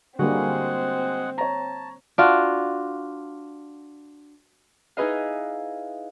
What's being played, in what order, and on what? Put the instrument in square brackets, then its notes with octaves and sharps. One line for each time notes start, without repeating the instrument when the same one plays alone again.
[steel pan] D3 G3 A#3 [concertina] G#3 G#4 F#5 [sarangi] C4 [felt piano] F#4
[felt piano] C#5 A#5 [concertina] A5
[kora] D4 F4 F#4
[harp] D#4 E4 G#4 B4 D#5 F5